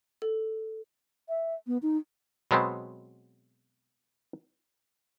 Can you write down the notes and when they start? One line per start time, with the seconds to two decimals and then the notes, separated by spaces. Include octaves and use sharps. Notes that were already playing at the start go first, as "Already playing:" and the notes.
0.22 A4
1.29 E5
1.67 B3
1.82 D#4
2.51 B2 F#3 G#3 B3 C4